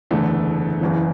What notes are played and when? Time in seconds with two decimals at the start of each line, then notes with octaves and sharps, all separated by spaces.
0.11 F#1 E2 D3 A3
0.81 F#1 E2 C#3 E3